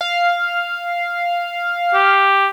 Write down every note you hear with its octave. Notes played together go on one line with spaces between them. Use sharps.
F5
G4